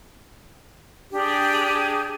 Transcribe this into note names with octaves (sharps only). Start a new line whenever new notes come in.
D4 G4 G#4